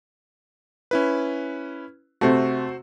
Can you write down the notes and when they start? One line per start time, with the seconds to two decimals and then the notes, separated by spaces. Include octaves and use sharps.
0.91 C#4 E4 B4
2.21 C3 A3 F#4 C5